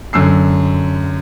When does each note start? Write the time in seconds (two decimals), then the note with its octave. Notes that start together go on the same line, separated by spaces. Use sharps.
0.13 F#2 D3 E6 C7